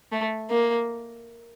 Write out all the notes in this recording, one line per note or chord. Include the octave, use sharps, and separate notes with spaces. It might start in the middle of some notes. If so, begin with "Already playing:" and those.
A3
A#3